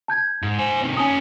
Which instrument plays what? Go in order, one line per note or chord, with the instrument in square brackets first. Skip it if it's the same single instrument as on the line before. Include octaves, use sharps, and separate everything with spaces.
[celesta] A5 G6 G#6
[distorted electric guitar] G#2
C5 G#5
C3 D#3
[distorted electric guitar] C#4 A4 [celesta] G#5 A5 D#6